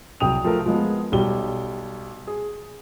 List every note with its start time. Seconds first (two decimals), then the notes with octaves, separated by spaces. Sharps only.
0.20 C2 F#3 G5 D#6 F7
0.44 F3 A3 A#4
0.66 F3 G#3 B3
1.12 B1 G3 G7
2.27 G#4